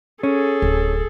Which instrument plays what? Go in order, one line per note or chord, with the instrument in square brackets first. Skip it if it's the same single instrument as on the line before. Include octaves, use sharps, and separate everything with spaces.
[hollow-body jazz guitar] C#4 [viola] G#4 A4
[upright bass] D1